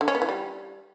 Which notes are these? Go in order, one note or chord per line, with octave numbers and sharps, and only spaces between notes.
D3
C#4
B3
E3
G3